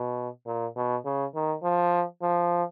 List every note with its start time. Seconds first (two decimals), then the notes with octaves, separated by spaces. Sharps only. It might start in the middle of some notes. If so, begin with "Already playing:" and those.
Already playing: B2
0.46 A#2
0.76 B2
1.05 C#3
1.35 D#3
1.63 F3
2.22 F3